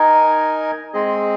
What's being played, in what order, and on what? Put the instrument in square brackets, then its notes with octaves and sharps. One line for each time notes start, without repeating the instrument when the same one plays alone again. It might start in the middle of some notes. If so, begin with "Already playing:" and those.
Already playing: [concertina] D#4 A#4 D#5 G#5
G#3 C4 G#4 D#5